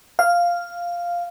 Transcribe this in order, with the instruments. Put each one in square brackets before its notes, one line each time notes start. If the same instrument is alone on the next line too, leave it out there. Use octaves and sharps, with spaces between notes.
[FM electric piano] F5